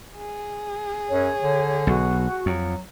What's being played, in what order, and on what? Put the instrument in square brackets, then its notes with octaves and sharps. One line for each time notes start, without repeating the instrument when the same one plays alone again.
[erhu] G#4
[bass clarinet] F#2 [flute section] C#5
[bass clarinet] D3
[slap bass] B1 [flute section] F#4
[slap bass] F2 [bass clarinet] F#3